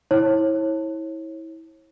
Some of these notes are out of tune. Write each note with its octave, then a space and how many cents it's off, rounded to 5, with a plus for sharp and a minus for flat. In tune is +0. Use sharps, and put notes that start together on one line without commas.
E4 -25 C#5 -35